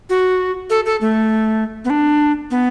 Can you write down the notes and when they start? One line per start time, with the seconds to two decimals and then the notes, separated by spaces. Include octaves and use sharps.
0.10 F#4
0.70 A4
0.86 A4
1.01 A3
1.85 B3
1.90 D4
2.51 B3